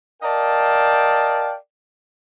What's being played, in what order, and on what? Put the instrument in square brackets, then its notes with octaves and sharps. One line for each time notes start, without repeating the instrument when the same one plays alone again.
[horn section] A#4 D5 D#5 F5 G5 A5